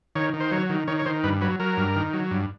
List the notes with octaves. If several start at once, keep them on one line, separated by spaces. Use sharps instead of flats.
D#3 C#5
D#3
C5
F#3 C#5
D#3
D#3 C#5
C#5
D#3 C5
G2 B4
F#3 B4
F#3 A#4
G2
D#3
F#3
G2